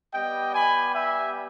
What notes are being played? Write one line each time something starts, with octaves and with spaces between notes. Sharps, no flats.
G3 B3 G4 D#5 G5
G#5 B5
E5 G#5